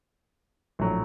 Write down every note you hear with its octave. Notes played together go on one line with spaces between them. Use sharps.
A#1 A2 F#3